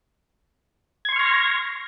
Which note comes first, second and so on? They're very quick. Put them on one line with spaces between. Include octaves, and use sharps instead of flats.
G#6 C6 C#6 F6 A#6